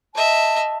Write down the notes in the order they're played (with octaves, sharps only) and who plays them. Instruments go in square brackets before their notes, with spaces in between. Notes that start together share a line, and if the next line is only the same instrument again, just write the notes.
[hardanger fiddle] D#5 E5 [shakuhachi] A5